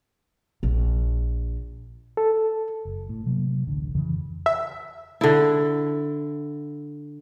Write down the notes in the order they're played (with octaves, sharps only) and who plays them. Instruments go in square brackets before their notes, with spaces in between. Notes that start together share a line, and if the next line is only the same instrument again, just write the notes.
[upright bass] A#1
[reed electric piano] A4
[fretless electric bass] F#1
A2
C3 F#3 A#3
D1 A1 D3
F2 C#3 E3
[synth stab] E5
[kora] D3 E4